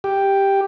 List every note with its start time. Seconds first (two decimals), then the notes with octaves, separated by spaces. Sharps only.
0.04 G4